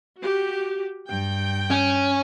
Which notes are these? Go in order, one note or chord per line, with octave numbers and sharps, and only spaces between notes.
F#4 G4
G2 G5
C#4